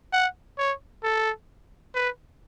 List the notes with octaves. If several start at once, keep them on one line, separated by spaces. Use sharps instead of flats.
F#5
C#5
A4
B4